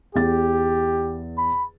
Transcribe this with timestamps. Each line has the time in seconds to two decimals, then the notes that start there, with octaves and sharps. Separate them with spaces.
0.15 E2 G4 A6
1.38 B5